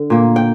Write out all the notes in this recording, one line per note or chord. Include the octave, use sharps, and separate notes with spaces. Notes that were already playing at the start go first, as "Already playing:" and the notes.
Already playing: D3
A#2 A#3
G5